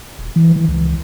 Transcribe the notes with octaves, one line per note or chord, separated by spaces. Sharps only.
D#1
E3
E3
C#2